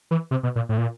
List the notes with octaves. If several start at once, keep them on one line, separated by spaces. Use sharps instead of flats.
E3
C3
B2
A#2
A2
A#2